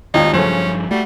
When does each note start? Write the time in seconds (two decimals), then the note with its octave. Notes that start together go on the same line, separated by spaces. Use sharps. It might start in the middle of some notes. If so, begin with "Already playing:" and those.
0.14 G#1 D#2 D#4 F4 G4
0.33 G2 C#3 F3 F#3 A3 C#4 C5
0.91 G3 A3 F#4